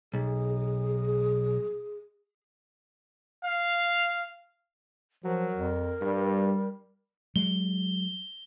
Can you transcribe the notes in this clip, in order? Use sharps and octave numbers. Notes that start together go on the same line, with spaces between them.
B1 G#4
F5
F3 F#3 A#4
F2
G2 G3
F#3 G#3 G7